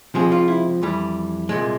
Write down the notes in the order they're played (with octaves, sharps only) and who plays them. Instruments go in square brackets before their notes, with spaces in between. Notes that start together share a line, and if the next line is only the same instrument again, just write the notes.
[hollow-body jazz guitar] C#2 C3 F3 G#3 G#4
F4
E4
F2 E3 G3
C2 A#2 G#3